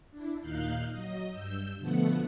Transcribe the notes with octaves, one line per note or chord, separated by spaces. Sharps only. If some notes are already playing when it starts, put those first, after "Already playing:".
D4 E4
D#2 A#2 D#4 F5 F#6 G6
F#3 D#5
G2 E6 G6
B2 D3 F3 A3 B3 F#5